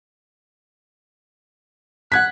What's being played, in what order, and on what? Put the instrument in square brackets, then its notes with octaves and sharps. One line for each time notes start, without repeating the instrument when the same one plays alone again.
[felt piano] F#5 G#6 B6 [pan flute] F#6